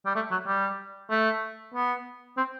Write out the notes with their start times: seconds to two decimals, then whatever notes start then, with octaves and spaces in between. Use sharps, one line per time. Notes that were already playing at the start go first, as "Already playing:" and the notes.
0.06 G3
0.16 A3
0.31 F#3
0.47 G3
1.11 A3
1.74 B3
2.37 C4